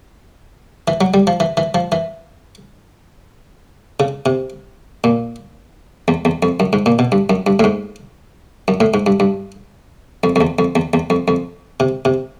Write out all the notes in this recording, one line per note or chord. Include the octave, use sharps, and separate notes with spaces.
E3
F#3
G3
F3
E3
E3
F3
E3
C#3
C3
A#2
E2
E2
F2
F#2
G#2
A#2
B2
G2
F#2
G2
A2
G#2
F#2
A2
G#2
G2
G2
F2
F2
E2
F2
E2
E2
F2
F2
C3
C3